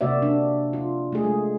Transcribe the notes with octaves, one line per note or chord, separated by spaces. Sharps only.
C3 A#3 F#4 D5 E5
D4
F4
A3 G#4
G#3